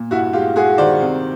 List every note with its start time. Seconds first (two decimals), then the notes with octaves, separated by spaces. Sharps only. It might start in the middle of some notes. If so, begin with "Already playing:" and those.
Already playing: A#2
0.11 G2 E4 F#4
0.33 G#3 F4 G4
0.56 G#3 F#4 G#4
0.78 D#3 C5 D5
1.01 C3